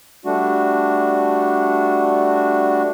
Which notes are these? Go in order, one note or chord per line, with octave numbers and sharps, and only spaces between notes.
G3 A3 D4 F#4